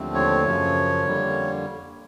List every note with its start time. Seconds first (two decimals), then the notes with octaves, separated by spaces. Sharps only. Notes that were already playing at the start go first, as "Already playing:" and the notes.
Already playing: D#2 D3 F3 A3 C4
0.14 C#5
0.44 F#2 C#3 F3
1.05 F2 D3 G3 A#3